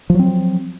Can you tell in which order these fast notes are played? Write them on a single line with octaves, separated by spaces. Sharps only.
F3 F#3 C4